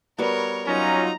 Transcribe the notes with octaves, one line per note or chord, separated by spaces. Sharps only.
G3 B3 F#4 A#4 C#5
F#3 C#4 D#4 F4 A#5